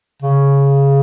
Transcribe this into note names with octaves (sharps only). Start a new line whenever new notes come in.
C#3